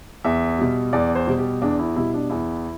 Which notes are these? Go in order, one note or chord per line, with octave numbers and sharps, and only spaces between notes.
E2 E5
B2 G3
E2 D5
C5
B2 G3
G4
E2 D4
E4
B2 G3 E4
D4
E2 E4